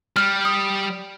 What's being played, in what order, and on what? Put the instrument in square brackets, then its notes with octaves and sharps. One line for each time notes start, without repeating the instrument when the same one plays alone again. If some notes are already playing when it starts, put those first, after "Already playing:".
[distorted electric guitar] G3 [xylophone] F6
[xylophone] D#6